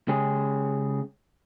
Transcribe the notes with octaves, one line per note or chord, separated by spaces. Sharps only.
C#3 G#3 C#4 G4 G#4